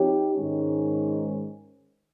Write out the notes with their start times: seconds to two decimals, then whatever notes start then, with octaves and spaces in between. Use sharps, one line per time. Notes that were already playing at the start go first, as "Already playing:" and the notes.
Already playing: F3 C4 D#4 G4 C#5
0.35 G#2 D#3 G#3 C#4